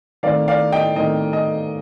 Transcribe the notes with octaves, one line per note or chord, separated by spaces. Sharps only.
D#3 A3 C4 D5 F5
D5 F5
D#5 G5
D#3 A3 C4 D#5
D#5